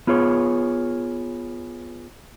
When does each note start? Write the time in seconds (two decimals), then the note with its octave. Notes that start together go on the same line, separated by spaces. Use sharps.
0.07 B3 F4 G#4 C#5